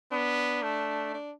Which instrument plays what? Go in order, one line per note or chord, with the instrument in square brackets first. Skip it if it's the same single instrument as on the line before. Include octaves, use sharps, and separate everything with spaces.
[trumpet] B3 [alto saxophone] D4
[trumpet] A3
[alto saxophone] D4